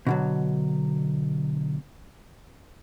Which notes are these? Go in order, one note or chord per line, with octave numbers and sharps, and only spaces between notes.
B2 D3 F#3